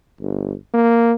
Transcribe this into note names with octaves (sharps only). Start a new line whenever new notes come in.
G1
A#3